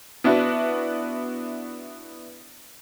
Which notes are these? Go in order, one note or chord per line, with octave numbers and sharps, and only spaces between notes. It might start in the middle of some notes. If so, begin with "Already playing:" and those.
B3 D4 E4 F#4 B4